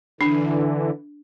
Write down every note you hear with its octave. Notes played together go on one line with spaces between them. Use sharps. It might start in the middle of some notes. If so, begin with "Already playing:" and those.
D3 E3 D4